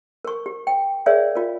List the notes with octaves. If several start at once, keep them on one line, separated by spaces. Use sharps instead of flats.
A#4 C#6
G4
G5
G#4 A#4 C#5 D5 E5 F5
F4 A#4